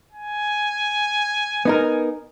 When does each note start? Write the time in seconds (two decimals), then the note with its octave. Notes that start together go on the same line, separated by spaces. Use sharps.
0.12 G#5
1.65 B3 D#4 A#4